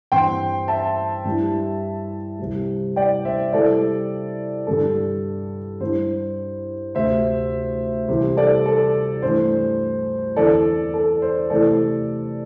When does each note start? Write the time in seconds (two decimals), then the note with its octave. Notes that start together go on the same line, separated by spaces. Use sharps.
0.12 G2 E3 C4 G5 C6
0.68 E5 A5
1.25 G2 G3 E4
2.39 C2 C3 G3
2.96 D5 G5
3.25 C5 E5
3.53 C3 G3 E4 A4 D5
4.67 G2 D3 G3 D4 A4
5.80 G2 G3 E4 C5
6.95 D2 C3 A3 C5 E5
8.08 C2 C3 E3 C4 C5
8.37 A4 D5
8.66 A4
9.22 G2 E3 A3 C5
10.36 E2 D3 C4 E4 A4 D5
10.94 A4
11.22 C5
11.50 C3 E3 A3 E4 A4 D5